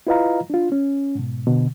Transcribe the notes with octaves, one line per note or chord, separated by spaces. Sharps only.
E4 F4 B4 D#5 F5 A#5
D4 F4
C#4
G#2 B2
B2 D3